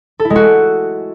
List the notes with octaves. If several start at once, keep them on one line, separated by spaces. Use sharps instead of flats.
A4
E4
G#3
F#4